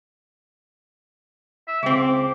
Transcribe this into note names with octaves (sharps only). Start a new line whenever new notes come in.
E5
C#2 C4 D6